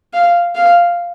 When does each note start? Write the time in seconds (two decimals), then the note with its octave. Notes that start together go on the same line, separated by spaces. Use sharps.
0.13 F5
0.55 F5